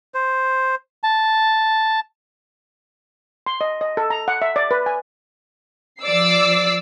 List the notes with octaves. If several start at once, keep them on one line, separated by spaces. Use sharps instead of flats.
C5
A5
C6
D#5
D#5
A4
A#5
F#5
E5
D5
B4
G#5
F3 D5 D6 E6 C7